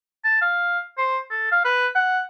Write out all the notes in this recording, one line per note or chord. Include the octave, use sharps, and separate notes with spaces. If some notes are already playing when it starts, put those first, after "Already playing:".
A5
F5
C5
A4
F5
B4
F#5